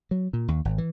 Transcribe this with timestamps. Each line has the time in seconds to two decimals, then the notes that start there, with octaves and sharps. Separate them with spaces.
0.11 F#3
0.33 A#2
0.48 D#2
0.65 G#1
0.78 E3